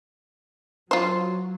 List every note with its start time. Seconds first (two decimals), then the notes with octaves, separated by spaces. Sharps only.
0.91 F#3 F4 C5